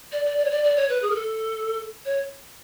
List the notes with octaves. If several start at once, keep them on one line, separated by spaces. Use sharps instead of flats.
D5
D5
D5
C#5
D5
D5
C#5
B4
G#4
A#4
A4
C#5